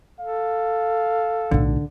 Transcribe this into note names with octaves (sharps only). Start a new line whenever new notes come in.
A4 F5
B1 A2 D3